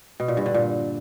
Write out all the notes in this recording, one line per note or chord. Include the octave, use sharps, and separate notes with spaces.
B2
A#2
G2
D3
A#2